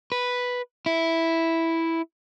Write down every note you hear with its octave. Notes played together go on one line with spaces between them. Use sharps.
B4
E4